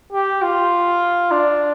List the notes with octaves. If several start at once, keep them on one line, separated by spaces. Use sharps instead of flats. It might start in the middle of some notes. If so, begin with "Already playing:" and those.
G4
F4
D4